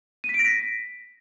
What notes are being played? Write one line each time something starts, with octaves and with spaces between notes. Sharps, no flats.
D#7
B6
D7
A#6
B6